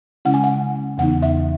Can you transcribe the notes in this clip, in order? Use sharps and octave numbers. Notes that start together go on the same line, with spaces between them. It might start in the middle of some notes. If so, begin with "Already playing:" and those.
C#3 G#3 C#4 E4 F#5
G#5
F#5
E2 C#3 E3 B3 D#4 F#5
E5